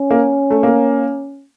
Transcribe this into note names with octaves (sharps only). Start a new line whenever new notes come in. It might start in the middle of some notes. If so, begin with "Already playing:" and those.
Already playing: C#4
A#3
A3
A#3